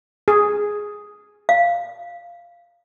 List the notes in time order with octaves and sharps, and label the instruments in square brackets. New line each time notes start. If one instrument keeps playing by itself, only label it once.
[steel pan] G#4
[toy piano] F5